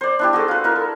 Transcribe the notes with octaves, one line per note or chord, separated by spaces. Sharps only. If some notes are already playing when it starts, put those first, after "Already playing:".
C5 D5
D4 E4 G4
F#4 G#4 A4
F4 B4
E4 A#4
A4